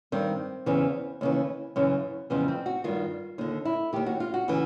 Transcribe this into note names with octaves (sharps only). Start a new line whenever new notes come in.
G2 D#3 C4
E2 C#3 E3
D#2 C#3 E3
F#2 C#3 E3
F2 C#3 E3 B3
C4
F#4
G2 D#3 F4
D#2 D3 D#4
E4
D#2 D#3 G4
F#4
F4
F#4
C#3 E3